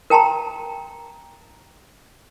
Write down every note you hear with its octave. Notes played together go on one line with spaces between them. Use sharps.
A#4 G5 A5 A#5 C6